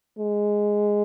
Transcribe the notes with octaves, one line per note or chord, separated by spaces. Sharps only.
G#3